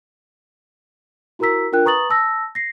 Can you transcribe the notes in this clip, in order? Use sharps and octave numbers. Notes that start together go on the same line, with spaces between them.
E4 F#4 A#4 A#5 E6 B6
D4 F4 A#4 G5 F#6
B4 A#5 C#6 D#6 A6 F#7
A5 E6 A#6
A#6 C7